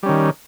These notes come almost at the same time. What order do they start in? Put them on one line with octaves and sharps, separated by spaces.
G3 C#4 D#3